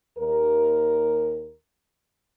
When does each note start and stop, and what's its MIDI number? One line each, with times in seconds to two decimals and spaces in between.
0.18 1.55 39
0.18 1.55 70